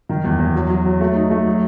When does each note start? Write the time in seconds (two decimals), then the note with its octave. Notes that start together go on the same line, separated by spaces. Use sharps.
0.09 D#3
0.24 E2
0.39 E2
0.55 F#3
0.70 F#3
0.85 F#3
1.00 A3
1.15 D#4
1.31 A3
1.47 F#3